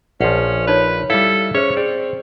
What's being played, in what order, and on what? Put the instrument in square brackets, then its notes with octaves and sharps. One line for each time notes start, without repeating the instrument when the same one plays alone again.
[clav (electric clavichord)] A#1 F3 [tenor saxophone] C#4 [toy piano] F#5
[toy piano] D#4 C#5 [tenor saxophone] B4
[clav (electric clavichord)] G3 E4 [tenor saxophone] A4 [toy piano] F5
[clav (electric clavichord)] C#4 E5 [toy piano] G#4 C5 [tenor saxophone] C#5
[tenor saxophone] C4 [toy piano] G#4 [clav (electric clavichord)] D5